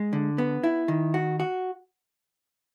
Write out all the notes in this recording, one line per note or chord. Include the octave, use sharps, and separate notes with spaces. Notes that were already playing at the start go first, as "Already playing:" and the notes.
Already playing: G#3
D3
B3
E4
D#3
F#4
F#4